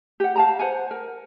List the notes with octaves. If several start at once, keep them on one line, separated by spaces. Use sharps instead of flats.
G4 F#5
F5 A5 A#5
C5 F#5 G#5
A#4